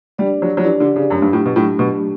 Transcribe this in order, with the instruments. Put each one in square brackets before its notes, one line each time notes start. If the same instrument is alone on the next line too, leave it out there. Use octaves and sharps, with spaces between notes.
[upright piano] G3 [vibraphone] D4 G4 D5
[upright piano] F#3
F#3
[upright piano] E3 [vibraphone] D4 G4 D5
[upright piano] D3
C#3
[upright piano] F#2 [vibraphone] F#3 A3 D4 G4
[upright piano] G2
A2
B2
[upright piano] A2 [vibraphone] F#3 A3 D4 G4
[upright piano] B2